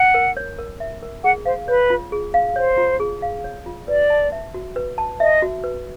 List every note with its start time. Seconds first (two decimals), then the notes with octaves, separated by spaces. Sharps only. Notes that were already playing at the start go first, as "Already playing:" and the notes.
Already playing: F#5
0.14 A#4
0.37 C#5
0.59 A#4
0.80 E5
1.03 A#4
1.24 G#4 F#5
1.46 C5 F5
1.68 B4 C#5
1.90 F4
2.12 G#4
2.34 F5
2.56 C5 C#5
2.78 F4
3.00 G#4
3.22 F5
3.44 C#5
3.66 F4
3.88 B4 D5
4.10 A5
4.32 E5
4.54 F#4
4.76 B4
4.98 A5
5.20 D#5 E5
5.42 F#4
5.64 B4